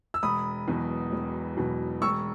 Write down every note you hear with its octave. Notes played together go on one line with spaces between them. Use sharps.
E6
E1 B5 D#6
E2 B2 F#3
E1
E2 B2 F#3
E1 C#6 E6